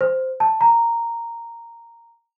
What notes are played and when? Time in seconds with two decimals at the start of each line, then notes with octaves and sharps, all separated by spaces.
0.01 C5
0.40 A5
0.61 A#5